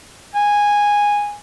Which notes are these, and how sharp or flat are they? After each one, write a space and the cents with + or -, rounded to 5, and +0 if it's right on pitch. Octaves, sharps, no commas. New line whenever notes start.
G#5 -10